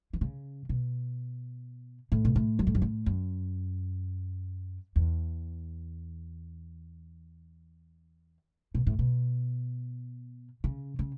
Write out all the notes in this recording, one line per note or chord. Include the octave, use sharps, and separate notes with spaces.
E3
C#3
B2
A2
B2
A2
F#2
A2
F#2
A2
F#2
E2
B2
A2
B2
C#3
C#3